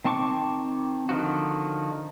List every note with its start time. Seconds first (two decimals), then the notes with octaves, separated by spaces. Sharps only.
0.05 D#3 C4 A5 C#6 D6
1.09 D3 D#3 F3 F#4